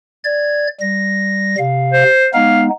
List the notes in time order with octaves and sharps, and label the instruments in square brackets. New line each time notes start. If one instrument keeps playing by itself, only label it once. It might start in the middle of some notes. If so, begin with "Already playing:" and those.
[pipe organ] D5 G#6
G3 A#6
C3 F5
[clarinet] C5
[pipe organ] G#3 B3 D#4 [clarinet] F5